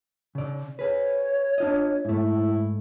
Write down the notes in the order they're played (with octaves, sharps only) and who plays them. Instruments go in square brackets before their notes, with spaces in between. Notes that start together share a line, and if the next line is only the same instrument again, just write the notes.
[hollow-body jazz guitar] C#3 D5
[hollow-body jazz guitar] G#4 B4 [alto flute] C#5
[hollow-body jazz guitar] D4 F4 D#5
[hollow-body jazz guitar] G#2 A3 [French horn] E4